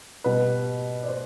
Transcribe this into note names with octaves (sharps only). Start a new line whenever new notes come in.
B2 G3 B4
D5
C5